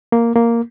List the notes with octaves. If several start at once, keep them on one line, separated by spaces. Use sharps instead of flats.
A#3
A#3